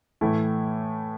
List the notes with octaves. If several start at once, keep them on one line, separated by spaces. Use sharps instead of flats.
A2 E3 A3 E4